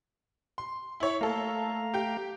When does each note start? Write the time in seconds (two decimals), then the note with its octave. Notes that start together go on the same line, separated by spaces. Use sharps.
0.58 C6
1.00 E4 C#5
1.21 A3 A#3 A4 F5 A#5
1.94 G4 G5